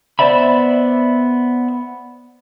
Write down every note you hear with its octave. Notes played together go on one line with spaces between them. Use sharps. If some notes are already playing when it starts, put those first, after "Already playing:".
B3 C5 D5 E5 B5